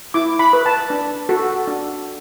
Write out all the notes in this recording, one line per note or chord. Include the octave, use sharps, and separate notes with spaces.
E4 D6
B5
B4
A5
D4
F#4 A4
D4